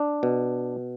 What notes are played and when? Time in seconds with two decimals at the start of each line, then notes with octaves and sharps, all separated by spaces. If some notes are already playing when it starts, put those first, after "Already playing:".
Already playing: D4
0.23 B2